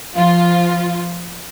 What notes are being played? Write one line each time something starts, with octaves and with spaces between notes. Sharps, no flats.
F3 F4